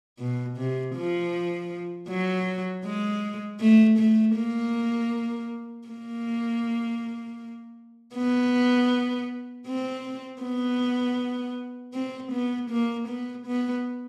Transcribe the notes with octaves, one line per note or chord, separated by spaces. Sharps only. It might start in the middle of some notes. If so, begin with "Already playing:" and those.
B2
C3
F3
F#3
G#3
A3
A3
A#3
A#3
B3
C4
B3
C4
B3
A#3
B3
B3